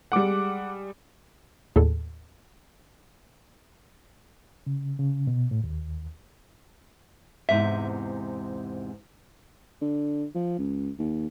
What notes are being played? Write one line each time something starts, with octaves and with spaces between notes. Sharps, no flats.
G3 G#3 F#5 D6
D#2 A2 G#4 A4
C#3
C#3
B2
A2
D#2
E2 G#2 C3 E5
D3
F3
C#2
D#2